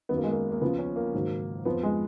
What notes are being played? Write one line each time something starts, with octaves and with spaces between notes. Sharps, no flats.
F#2 D#3 F#3 B3
A#3
G#3
A#3
A#3
C#2 C#3 F3 B3
C#4
A#3
G#2 D#3 F#3
F2 F3 B3
G#3